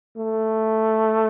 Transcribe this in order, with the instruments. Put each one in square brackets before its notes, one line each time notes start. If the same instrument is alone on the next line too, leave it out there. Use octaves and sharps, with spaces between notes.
[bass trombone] A3